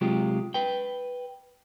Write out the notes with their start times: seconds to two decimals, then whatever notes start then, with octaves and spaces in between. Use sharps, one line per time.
0.01 C3 F#3 G#3 F4 G4
0.54 B4 G5